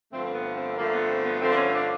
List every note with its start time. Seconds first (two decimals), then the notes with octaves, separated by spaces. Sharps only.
0.12 G2 D3 F3 A3 C4
0.26 C4
0.35 B3
0.56 C4
0.77 G2 D3 F3 A3 A#3
0.88 A#3
0.94 B3
1.09 C4
1.26 B3
1.41 G2 D3 F3 A3 C4
1.50 D4
1.57 C#4
1.74 D4